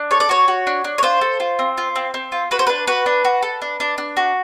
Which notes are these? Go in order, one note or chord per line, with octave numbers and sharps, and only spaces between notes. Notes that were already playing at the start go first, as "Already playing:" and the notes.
Already playing: D4
A4 C#5
D5
F#4 C#5
F#4
D4
D4
C#5
F4 C5
A4
F4
C4
F4
C4
C4
F4
F#4 B4
C5
D4 B4
F#4 B4
D4
F#4
A4
D4
D4
D4
F#4